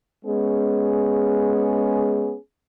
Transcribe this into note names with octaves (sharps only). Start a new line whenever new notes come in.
G#3 B3 C#4 G#4